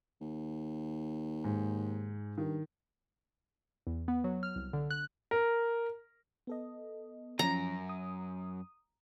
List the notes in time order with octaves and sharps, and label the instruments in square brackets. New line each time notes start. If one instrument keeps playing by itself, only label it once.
[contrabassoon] D#2
[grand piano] G#2
[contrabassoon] G2 [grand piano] D#3
[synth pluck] E2
B3
F#3
F6
C2
D3
F#6
[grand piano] A#4
[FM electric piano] B3 A4 D#5
[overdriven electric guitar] F#2 [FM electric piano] F3 C#4 [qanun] A#5
[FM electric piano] D#6